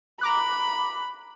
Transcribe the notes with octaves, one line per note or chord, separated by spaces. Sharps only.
A#5 B5 D6 F#6